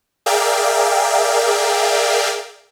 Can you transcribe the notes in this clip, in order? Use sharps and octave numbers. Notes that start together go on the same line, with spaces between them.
G#4 A#4 D5 E5 F5 G5